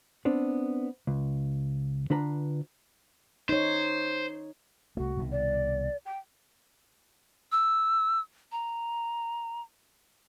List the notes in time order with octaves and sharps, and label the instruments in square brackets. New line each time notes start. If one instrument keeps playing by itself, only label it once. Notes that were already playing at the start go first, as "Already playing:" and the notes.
[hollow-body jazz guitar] B3 C4 D4
C#2
D3 D4 F4 B4 A#5
[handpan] D#4 C#5 [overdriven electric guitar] C5
[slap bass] C2 A3 [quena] F#4
[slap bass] C2 B2 D#3
[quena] D5
G5
[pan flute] E6
A#5